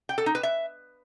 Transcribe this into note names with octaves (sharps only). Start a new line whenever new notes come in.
G5
A4
D#4
B4
E5